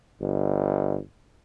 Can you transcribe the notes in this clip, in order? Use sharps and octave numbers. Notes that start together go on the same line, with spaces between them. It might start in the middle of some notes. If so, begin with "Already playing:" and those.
G1